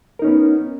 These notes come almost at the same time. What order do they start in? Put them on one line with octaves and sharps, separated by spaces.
A#4 D#4 C#4 B3